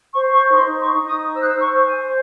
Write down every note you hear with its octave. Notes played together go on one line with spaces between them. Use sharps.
C5 C#6
C#6
D#4 C6
C#6
D#4
D#6
C5 E6
F#6
E6
C#6
C5
G#5